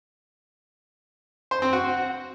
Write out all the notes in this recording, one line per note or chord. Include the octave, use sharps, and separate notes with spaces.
C5
C4
F#4